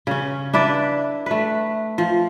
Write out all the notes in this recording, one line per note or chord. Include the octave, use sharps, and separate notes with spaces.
C#3 C#4
D4 E4 B4 D5
A3 B4
F3